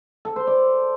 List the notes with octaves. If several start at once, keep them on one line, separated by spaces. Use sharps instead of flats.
A4
C5
D5